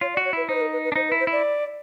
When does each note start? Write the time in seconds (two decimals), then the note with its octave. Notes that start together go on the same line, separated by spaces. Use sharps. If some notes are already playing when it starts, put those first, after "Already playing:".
0.01 F4 C#5
0.14 D5
0.17 F#4
0.25 C#5
0.33 E4 B4
0.49 D#4 C5
0.55 B4
0.61 A#4
0.73 B4
0.84 B4
0.92 D4
0.96 D#4 C5
1.08 B4
1.12 E4
1.20 C5
1.27 E4 D5